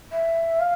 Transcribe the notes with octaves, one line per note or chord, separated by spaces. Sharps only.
E5
F5